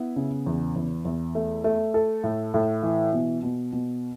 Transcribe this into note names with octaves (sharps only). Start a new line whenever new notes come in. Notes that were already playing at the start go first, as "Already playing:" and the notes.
Already playing: B3 E4
C#3
E2
E2
E2
A3
A3
A4
A2
A2
E3
B2
B2
B2